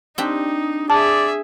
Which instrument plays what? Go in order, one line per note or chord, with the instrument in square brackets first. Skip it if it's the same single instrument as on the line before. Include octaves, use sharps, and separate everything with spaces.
[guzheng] C4 D4 G4 [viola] D#4
[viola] G#4 E5 [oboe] D5 [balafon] A5